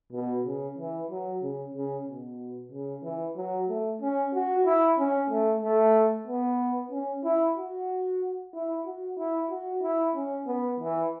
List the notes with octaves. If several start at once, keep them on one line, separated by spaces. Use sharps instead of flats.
B2
C#3
E3
F#3
C#3
C#3
B2
C#3
E3
F#3
A3
C#4
F#4
E4
C#4
A3
A3
B3
C#4
E4
F#4
E4
F#4
E4
F#4
E4
C#4
B3
E3